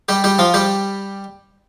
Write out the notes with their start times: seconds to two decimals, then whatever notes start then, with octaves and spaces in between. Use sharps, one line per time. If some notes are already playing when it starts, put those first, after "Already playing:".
0.09 G3 G4
0.24 G3 G4
0.39 F3 F4
0.54 G3 G4